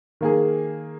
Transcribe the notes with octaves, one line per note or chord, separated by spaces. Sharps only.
D#3 A#3 G#4